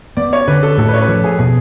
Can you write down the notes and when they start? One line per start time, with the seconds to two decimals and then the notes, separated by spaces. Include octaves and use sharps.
0.17 B3 D5
0.33 C#5
0.48 D3 B4
0.63 A4
0.78 A2 A4
0.88 B4
0.94 C#5
1.01 B4
1.08 F3 A4
1.24 G#4
1.38 B2 G#4